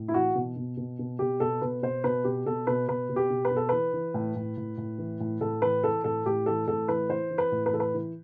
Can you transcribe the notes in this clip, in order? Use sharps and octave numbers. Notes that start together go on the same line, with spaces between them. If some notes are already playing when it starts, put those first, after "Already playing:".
Already playing: A2
E4
E3 F#4
B2
B2
B2
B2
B2 G4
B2 A4
B2 B4
B2 C5
B2 B4
B2 G4
B2 A4
B2 B4
B2 B4
B2
G4
B2
B4
B2
A4
E3 B4
E3
A2
A2
A2
A2
E3
A2
A2 A4
E3 B4
E3 A4
A2 A4
A2 G4
E3 A4
A2 A4
E3 B4
E3 C5
E3
B4
A2
B4
E3 A4
B4
E3